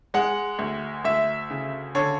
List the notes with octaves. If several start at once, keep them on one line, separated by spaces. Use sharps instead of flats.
G#3 F#5
D2
D2 E5
C#3
D3 C#5